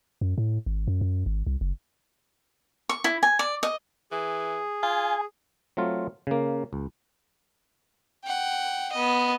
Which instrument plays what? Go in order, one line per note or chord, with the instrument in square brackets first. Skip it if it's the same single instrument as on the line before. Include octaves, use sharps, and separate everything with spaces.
[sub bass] F#2
A2
G#1
F#2
F#2
G#1
C2
F#1
[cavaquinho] C#6
E4
G#5
D5
D#5
[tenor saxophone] E3 [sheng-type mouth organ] G#4
[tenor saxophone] F4 [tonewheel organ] G#5
[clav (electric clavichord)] F#3 A3 C4 F4
C#3 A#3
C#2
[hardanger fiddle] F#5 G5
B3 D#5